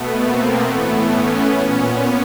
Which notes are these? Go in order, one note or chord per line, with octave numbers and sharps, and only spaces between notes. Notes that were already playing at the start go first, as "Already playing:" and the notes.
Already playing: B2 A3 B3
A#3 C4
A2 E3 A3 B3
B3 C#4
A#2